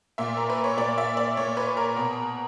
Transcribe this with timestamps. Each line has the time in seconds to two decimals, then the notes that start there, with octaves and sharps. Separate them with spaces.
0.18 A#2 E5
0.37 A#4
0.50 B4
0.64 C#5
0.77 A#2 D5
0.98 E5
1.17 D5
1.37 A#2 C#5
1.57 B4
1.77 A#4
1.97 B2